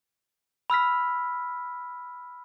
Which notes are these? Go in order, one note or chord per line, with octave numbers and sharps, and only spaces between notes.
B5 E6 F6 B6